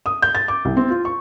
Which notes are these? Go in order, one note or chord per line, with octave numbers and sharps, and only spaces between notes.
D#6
G6
A6
D6
C2
C4
F4
C#6